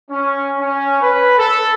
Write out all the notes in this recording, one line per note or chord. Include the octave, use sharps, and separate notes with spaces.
C#4
C#4
B4
A4